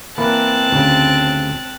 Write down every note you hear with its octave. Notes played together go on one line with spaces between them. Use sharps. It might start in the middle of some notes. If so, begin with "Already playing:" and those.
E3 A#3 C4 B4 A5 F#6
D2 C#3